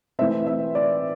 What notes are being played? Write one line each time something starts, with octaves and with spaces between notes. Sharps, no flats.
E3 A3 C4 E5
E5
D5